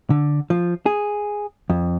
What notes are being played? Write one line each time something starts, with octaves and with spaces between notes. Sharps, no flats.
D3
F3
G#4
F2